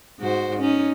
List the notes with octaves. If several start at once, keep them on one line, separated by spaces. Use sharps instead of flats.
G#2 F#4 C5
C#4 D#4